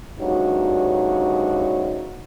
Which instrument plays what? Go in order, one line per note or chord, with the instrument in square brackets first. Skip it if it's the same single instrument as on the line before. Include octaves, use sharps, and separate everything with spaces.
[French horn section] D2 G2 C#3 D#4 F#4 C#5